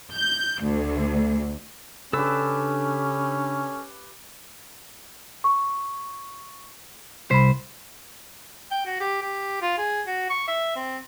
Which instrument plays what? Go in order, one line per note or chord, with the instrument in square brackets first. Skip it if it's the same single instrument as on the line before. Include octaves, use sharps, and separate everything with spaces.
[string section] G6
D2
[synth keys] C#3 D4 [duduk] C#4 [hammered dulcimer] G4 B4 [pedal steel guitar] A4 E6
[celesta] C#6
[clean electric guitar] C2 C5 [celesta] B5 B6
[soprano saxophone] G5
F#4
G4
G4
F4
G#4
F#4
C#6
E5
C4